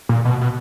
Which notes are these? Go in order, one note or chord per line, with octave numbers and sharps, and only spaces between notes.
A#2
B2
B2